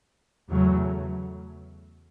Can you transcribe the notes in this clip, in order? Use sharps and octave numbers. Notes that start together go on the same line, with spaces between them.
E2 C#3 F#3 A3